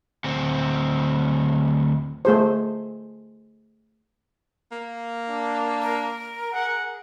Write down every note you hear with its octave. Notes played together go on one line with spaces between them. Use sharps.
D2 C4
A3 G#4 C5
A#3
D4
A#4
G#4 F#5